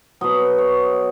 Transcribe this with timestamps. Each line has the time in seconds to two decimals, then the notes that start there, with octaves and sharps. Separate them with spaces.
0.21 B2 F#3 D#5
0.58 C#5